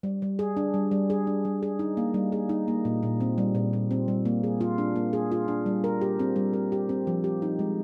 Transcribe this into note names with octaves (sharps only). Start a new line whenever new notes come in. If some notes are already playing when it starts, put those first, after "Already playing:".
G3
G3
G#4
D4
G3
G3
G#4
D4
G3
G#4
D#4
A#3
G3
G#4
D#4
A#3
A#2
A#2
C4
G3
A#2
A#2
C4
G3
A#3
G#4
F4
D4
A#3
G#4
F4
D4
G3
A#4
G4
C4
G3
A#4
G4
C4
F3
G4
D#4
G#3